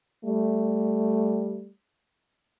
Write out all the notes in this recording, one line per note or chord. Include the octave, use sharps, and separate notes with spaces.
G3 A3